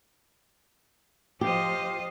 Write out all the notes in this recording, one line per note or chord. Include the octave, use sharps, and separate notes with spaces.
F3 G4 C5 D#5 F5